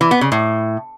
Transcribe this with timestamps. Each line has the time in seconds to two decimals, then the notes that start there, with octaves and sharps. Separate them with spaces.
0.01 E3
0.11 B3
0.21 C#3
0.32 A2